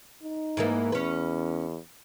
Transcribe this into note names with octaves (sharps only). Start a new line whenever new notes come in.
D#4
G#2 E3 A#3
E2 C#4 B4